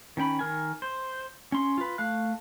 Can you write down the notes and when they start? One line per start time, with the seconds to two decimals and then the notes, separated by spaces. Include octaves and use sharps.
0.17 D#3 C#4 G5 B5
0.39 D#3 A#4 G#5
0.82 C5
1.52 C#4 C6
1.78 F4 B4
1.98 A3 F5 F#6